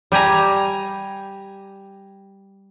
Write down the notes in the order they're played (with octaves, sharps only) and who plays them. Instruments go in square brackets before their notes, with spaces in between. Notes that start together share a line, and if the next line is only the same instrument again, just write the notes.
[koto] G3 G4 G#5 A#5